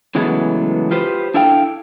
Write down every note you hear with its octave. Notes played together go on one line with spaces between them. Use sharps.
C#3 E3 F#3 G#3 A3 B3
F4 G4 B4 C5
D4 E4 A4 F5 G5